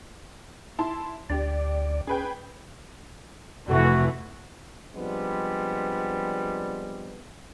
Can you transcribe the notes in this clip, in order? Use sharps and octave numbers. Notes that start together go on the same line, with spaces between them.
E4 A5 C6
D2 D4 G4 D5
C#4 G#4 B4 G5
F1 E3 A3 F#4
F3 G3 G#3 B3 C4 D4